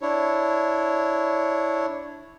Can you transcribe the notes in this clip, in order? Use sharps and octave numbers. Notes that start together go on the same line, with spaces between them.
D4 E4 C#5